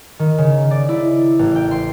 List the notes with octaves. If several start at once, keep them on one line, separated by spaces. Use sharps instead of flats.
D#3
C#3
D5
E4
A1
G5
C6